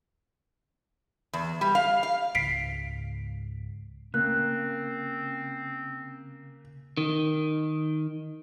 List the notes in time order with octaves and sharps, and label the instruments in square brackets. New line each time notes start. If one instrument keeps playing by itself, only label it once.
[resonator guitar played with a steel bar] E2
G3
F5
F5
[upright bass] C#2 G#2 [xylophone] B6 C7 D7
[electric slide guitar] C#3 [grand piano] A#3 [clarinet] C4 [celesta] F#6
[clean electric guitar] D#3